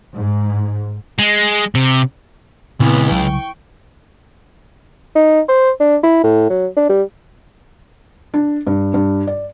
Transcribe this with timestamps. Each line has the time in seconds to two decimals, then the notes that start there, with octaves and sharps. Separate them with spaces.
0.17 G#2
1.19 G#3
1.75 C3
2.80 C#2 A#2 E3 B3 C4
3.11 C2 C#3 F#3 G5 C#6
5.16 D#4
5.49 C5
5.80 D4
6.03 E4
6.23 A2
6.50 F#3
6.76 D4
6.89 G3
8.34 D4
8.67 G2
8.94 G2
9.27 D5